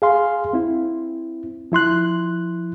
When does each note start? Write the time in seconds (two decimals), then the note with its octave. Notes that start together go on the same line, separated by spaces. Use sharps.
0.02 G#4 F5 C6
0.53 C4 E4
1.72 F3 E4 C6 F#6